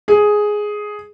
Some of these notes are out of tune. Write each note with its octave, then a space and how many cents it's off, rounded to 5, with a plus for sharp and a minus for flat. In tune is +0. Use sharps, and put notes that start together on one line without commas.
G#4 +5